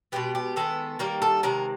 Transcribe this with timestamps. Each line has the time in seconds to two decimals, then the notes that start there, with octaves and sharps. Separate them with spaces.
0.12 B2 G#3 B3 G4
0.35 G4
0.56 D#3 G#3 B3 A4
0.99 D#3 G3 A#3 A#4
1.22 A4
1.43 C3 D#3 G#3 A#4